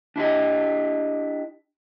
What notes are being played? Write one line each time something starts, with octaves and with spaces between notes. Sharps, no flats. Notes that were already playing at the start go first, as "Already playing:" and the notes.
D4 E4 G4 D#5